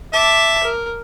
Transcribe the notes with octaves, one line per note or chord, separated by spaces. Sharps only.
E5 A5 D6
A#4